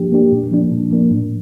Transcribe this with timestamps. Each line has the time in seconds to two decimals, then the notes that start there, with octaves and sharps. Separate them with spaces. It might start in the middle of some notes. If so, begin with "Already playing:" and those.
Already playing: F3 A#3 D4 G4
0.12 A#3 D4 G4
0.32 A#2
0.52 F3 A#3 D4
0.72 A#2
0.91 F3 A#3 D4
1.11 A2